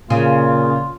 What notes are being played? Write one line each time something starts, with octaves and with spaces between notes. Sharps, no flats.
A#2 C#3 F4